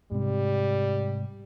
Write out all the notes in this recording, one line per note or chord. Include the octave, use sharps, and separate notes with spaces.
G#2 C3 G3